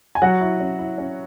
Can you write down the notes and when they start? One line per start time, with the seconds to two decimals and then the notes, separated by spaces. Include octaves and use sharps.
0.15 G#5
0.22 F#3 F#4 F#5
0.41 E4
0.60 C#4
0.79 E4
0.98 C#4